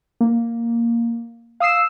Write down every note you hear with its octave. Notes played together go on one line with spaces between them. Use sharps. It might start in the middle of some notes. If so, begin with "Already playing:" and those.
A#3
F5 D#6 E6 C7 E7